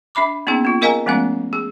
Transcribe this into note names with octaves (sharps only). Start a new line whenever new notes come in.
D4 E5 B5 D6
A#3 B3 C#4 D#4 G#4
A#3 F4
G#4 A#4 D#5 F5 G#5 A#5
F3 G#3 A3 B3 C#4 F5
G#4